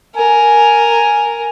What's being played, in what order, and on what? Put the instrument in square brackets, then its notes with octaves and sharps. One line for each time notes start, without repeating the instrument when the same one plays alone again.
[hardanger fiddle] A#4 [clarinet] G#5